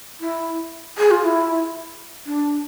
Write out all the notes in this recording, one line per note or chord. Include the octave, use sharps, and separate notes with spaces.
E4
G#4
F4
E4
D4